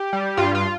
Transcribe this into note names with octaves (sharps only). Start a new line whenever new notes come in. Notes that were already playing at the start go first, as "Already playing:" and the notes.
Already playing: G4
G3
G2 F4
F4